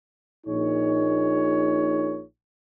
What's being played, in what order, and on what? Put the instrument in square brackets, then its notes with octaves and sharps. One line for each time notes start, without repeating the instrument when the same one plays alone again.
[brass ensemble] A#1 A#2 D#4 G#4 C#5